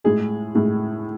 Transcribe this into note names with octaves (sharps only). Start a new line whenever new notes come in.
A2 G#3 G#4
A2 G#3